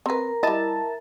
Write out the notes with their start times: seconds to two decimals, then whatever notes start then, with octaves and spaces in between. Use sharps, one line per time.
0.06 C4 A#4 B4 A#5
0.43 G3 E4 D#5 A5